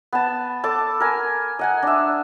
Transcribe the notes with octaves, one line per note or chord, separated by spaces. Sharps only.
B3 A5
A4 A5 D6
A#4 G#5
D#5 F#5 G#5
D4 E5